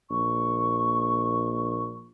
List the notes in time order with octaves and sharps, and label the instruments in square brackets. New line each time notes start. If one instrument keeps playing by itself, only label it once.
[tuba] A#1 [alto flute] C#6